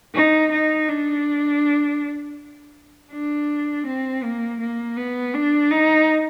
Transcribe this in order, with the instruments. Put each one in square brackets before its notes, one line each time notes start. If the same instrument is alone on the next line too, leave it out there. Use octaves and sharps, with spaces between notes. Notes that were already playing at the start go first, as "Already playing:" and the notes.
[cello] D#4
D#4
D4
D4
C4
A#3
A#3
B3
D4
D#4